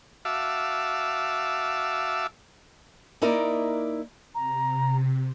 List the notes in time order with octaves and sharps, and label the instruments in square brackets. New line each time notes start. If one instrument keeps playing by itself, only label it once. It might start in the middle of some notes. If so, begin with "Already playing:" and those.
[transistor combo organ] F#4 E5 F5 A5 D6 E6
[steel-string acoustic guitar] A#3 D#4 E4 A#4 D5
[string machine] C3 [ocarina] A#5